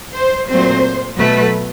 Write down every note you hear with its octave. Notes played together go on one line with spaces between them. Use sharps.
C5
A#2 F#3 A3 C4 C5
B2 F#3 A3 B4